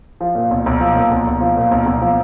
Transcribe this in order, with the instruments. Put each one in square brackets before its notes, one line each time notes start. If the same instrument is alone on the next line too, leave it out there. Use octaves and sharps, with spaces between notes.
[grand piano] F3
A#2
B1
B1
F3
A#2
B1
B1
F3
A#2
B1
B1
F3